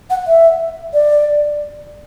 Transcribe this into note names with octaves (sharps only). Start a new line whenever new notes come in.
F#5
E5
D5